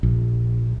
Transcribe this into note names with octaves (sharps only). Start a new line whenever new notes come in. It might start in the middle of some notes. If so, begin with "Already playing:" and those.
A#1